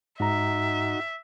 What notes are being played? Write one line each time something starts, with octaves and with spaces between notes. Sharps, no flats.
G#2 D#4 F#4 E5 A#5